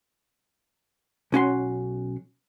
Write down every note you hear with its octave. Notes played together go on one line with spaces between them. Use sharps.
B1 C#4 F#4 C6